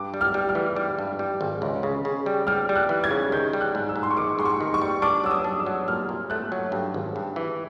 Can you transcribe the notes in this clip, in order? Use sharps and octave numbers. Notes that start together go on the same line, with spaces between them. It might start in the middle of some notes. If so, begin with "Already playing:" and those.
Already playing: G2 D6
G3
F6
G3
F6
E3
G3
G2
G3
G#1
C#2
C#3
C#3
G3
G3 F6
G3
F#6
E3
G#6
C#3
D#3 G6
G3
F#6
G#2
E6
G#2
C6
C#6
D#3 D6
G#2 C6
C#6
D#3
C#6
G3
D4 D6
F#3 E6
D#6
D4
E6
F#3
A#2 F6
A#2
A3 F#6
F#3
G2
G#1
G2
E3